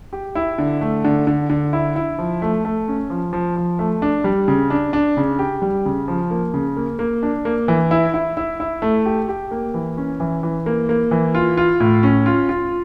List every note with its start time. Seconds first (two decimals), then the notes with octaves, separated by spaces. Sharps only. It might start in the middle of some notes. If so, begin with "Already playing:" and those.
0.13 G4
0.35 E4
0.58 D3
0.81 A3
1.04 D3
1.27 D3
1.50 D3
1.73 E4
1.96 E4
2.19 F3
2.42 A3
2.65 A3
2.88 C#4
3.10 F3
3.33 F3
3.56 F3
3.79 A3
4.02 D4
4.24 G3
4.48 C#3
4.70 D4
4.93 D4
5.17 C#3
5.39 G4
5.62 G3
5.85 C#3
6.08 F3
6.31 A#3
6.54 C#3
6.77 A#3
6.99 A#3
7.23 D4
7.45 A#3
7.68 E3
7.91 E4
8.14 E4
8.37 E4
8.60 E4
8.82 A3
9.06 G4
9.29 G4
9.51 A#3
9.74 E3
9.97 C#4
10.20 E3
10.43 E3
10.66 A#3
10.89 A#3
11.11 E3
11.35 F4
11.57 F4
11.80 A2
12.03 C#4
12.26 F4
12.49 F4